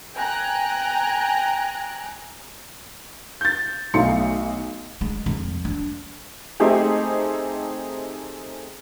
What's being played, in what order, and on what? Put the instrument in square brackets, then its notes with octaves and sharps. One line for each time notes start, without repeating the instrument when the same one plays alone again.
[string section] G5 G#5 A#5 F#6
[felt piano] G6 A6
B1 A3 D#4 F5 C6 C#7
[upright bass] G#3
F2
D4
[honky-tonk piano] A3 C4 D#4 G4 G#4